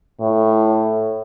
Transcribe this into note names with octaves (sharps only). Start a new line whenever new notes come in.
A2